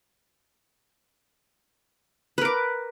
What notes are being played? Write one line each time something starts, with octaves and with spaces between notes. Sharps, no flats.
A#4 B4 D6